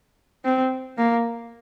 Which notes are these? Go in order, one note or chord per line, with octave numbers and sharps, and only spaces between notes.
C4
A#3